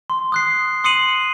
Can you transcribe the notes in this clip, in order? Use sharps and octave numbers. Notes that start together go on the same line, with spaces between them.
C6
D#6 F#6 C7
C6 D#6 C7 C#7 D#7 F#7